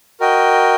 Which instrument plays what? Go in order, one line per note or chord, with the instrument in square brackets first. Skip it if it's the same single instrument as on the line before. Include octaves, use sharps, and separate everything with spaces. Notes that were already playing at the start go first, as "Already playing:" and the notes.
[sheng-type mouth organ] F#4 A#4 D#5 G5